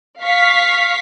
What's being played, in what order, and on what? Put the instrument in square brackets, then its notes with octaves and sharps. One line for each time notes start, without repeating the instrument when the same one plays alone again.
[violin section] F5 C#6 B6